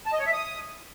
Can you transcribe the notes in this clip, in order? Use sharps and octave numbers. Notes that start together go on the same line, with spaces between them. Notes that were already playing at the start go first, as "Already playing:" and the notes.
A5
D#5
C#5
E5
D#6